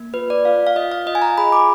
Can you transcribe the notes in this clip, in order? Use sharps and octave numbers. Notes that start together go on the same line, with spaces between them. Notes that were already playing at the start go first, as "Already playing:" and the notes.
Already playing: A#3
F4 B4
D5
F4 F5
F5
F4 D#5
F5
F4 D#5
G#5
A#5
G#4 B5
D6